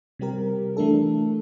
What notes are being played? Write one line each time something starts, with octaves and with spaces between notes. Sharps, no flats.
C3 G3 C4 G4 A#4
E3 A3 D4 A4